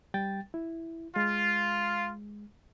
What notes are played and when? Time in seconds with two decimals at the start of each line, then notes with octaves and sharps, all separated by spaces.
0.14 G3 G5 A6
0.54 E4
1.16 G#3 F4